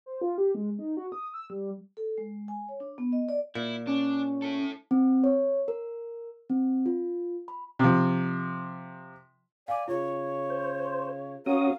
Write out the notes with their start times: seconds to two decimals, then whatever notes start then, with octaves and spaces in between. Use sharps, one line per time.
0.06 C5
0.21 F4
0.38 G4
0.55 G#3
0.79 D#4
0.97 F#4
1.12 D#6
1.34 E6
1.50 G3
1.97 A4
2.18 G#3
2.48 G#5
2.69 C#5
2.80 D4
2.98 B3
3.12 D#5
3.29 D5
3.55 A#2 E4
3.87 C#4 D4
4.42 E4 A4
4.91 C4
5.24 C#5
5.68 A#4
6.50 C4
6.86 F4
7.48 B5
7.79 C3 F3
9.68 D5 F5 G#5 D6
9.88 C#3 F4 C#5
10.50 C5
11.46 C#4 F#4 A#4 C#5 F5 D#6